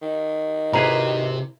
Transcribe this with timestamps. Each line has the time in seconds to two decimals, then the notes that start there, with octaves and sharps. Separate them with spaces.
0.02 D#3
0.73 G#1 C3 E4 G#4 B4 A#5